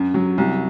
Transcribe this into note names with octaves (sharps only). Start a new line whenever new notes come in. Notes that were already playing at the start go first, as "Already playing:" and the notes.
Already playing: F#2
F#3
C2